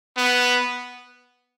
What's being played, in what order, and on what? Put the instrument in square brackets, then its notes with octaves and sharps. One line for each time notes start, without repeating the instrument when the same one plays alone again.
[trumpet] B3